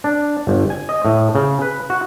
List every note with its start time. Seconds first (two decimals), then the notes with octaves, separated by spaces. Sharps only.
0.04 D4
0.47 G1
0.70 G#5
0.89 D#5
1.05 A2
1.35 C#3
1.62 B4
1.90 F#4